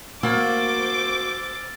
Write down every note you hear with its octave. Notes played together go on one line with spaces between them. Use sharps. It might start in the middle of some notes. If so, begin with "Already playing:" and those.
A#3 F#4 C5 D6 E6 F6 A6